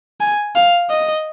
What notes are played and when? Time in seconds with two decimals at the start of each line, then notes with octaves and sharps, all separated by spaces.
0.21 G#5
0.56 F5
0.90 D#5